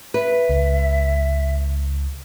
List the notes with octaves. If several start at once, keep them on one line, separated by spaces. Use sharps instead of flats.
B4 E5
C#2